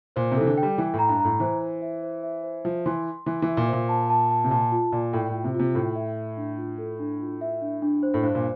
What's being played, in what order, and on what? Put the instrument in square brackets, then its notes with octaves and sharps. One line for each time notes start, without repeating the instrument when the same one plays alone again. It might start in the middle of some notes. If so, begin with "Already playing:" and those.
[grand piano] A#2 [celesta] C5
[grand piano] C3
[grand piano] E3 [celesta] A4
[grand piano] D3
[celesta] G5
[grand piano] G3
[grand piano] E3 [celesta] G5
[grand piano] A2
[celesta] A#5
[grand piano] G2
[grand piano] A2 [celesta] A#5
[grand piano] E3 [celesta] C5
[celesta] C5
E5
C5
E5
C5
[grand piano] F3 [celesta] E5
[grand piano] E3 [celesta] C6
[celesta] C6
[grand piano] E3 [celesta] C6
[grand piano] E3 [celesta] E5
[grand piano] A#2
[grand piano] A#2 [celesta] C5
[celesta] A5
A5
A5
[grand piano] C3
[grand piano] A#2 [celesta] A5
[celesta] F4
[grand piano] A#2 [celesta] D5
[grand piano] A2 [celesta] G5
[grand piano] A2
[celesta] F4
[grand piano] C3
[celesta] F4
[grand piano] C3
[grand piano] A2 [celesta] G5
[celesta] E5
E5
D4
F4
A4
D4
F4
E5
D4
D4
C5
[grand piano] A2
[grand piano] G2 [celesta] C5
[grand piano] A#2